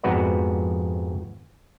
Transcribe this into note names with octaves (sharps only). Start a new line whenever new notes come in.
F2 G#2 B3 F#4 B4 D5